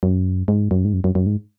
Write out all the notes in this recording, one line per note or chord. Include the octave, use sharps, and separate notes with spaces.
F#2
G#2
F#2
G#2
F#2
F#2
F#2
G#2